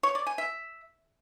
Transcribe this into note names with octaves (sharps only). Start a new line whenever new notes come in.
C#5
D5
G#5
E5